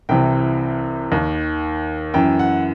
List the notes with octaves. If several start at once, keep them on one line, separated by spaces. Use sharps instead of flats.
C2 C3 E3 G5
D#2 D#3
F#2 E3 G5
F#5